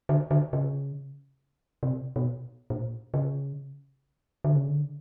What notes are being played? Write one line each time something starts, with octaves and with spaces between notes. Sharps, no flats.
D3
D3
C#3
C3
B2
A#2
C#3
D3
C#3
D3